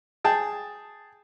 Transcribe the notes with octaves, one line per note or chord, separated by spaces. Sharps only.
G#4 G5 A5